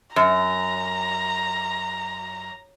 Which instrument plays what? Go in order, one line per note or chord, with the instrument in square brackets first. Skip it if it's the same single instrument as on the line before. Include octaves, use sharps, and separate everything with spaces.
[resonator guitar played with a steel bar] F#2 [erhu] A#5